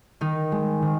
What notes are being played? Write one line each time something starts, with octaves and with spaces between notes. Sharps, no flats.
D#3 D#4
G#3
D#3